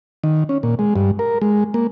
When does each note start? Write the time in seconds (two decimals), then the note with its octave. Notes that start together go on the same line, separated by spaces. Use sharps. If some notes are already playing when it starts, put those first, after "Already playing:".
0.24 D#3
0.49 C#4
0.63 A#2
0.79 G#3
0.96 G2
1.19 A#4
1.42 G#3
1.74 A#3